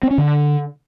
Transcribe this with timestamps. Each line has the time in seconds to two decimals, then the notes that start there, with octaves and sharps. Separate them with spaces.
0.03 C4
0.11 C#4
0.18 D3